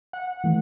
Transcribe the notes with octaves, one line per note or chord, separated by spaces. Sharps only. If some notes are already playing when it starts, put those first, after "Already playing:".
F#5
E3 A3